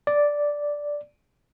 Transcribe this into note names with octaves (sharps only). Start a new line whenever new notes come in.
D5